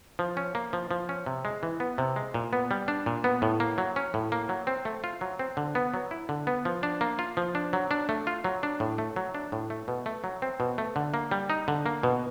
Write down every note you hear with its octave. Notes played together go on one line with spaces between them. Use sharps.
F3
C#4
A#3
F3
F3
C#4
C3
G#3
E3
B3
C3
G#3
A#2
B3
G3
D4
A#2
B3
A2
A#3
F#3
C#4
A2
A#3
F#3
C4
A3
F4
F#3
C4
D3
B3
F#3
E4
D3
B3
F3
D4
A#3
F4
F3
D4
F#3
D4
A3
F4
F#3
D4
A2
A3
F#3
D4
A2
A3
B2
A3
F#3
C4
B2
A3
D3
A#3
G3
D#4
D3
A#3
B2